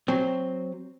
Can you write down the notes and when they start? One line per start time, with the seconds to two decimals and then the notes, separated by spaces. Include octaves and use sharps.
0.08 F#3 C4